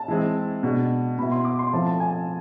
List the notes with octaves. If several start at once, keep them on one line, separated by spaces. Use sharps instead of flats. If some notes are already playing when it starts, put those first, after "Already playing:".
Already playing: A5
E3 G#3 C4
B2 G#3 D4
B2 B3 E4 B5
C6
D6
C6
F3 A3 C4 E4 A5
A5
G#5